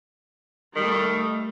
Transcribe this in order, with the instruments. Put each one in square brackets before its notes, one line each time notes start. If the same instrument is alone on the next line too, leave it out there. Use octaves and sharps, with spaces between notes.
[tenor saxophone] D#3 [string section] G3 A3